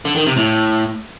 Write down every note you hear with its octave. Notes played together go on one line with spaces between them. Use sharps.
D3
D#3
C3
A2